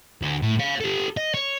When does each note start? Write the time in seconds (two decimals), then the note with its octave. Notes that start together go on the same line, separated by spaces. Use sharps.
0.22 D2
0.42 A2
0.60 C#5 F5
0.81 G4 A4
1.17 D#5
1.34 C#5